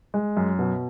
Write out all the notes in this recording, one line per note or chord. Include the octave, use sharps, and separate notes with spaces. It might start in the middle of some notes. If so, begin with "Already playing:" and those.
G#3
F#2
B2